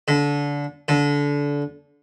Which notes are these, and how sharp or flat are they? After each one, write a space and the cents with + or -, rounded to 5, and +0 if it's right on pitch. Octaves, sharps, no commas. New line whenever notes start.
D3 -25
D3 -25